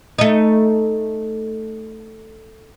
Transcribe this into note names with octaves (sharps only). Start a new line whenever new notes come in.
A3 D#4